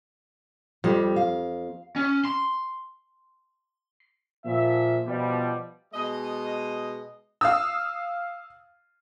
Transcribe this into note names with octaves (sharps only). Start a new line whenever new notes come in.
F2 G3 C4 G4
F5
C#4
C6
A#2 F3 E5
B2 F3 G3
B2 G#3 D#5
F5 D#6 E6